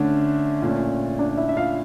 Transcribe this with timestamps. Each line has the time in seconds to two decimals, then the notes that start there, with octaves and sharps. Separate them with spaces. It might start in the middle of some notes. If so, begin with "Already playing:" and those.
Already playing: D3 A3 C#4 D4
0.62 A#2 A3 C#4
1.19 D4 D5
1.37 E4 E5
1.49 E5
1.57 F4 F5